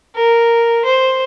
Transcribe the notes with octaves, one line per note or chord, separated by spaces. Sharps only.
A#4
C5